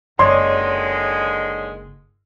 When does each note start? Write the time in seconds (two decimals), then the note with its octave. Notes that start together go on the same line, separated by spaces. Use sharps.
0.19 F#1 D3 D#3 G#3 C#5 D5 C6